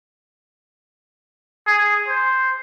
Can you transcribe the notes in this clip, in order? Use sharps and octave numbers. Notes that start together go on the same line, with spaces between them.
G#4
C5